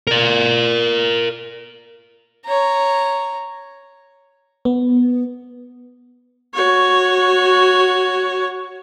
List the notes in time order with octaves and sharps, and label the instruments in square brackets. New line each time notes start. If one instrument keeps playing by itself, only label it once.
[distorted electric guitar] A#4 D5
[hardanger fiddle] C#5 A#5
[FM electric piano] B3
[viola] F#4 C#5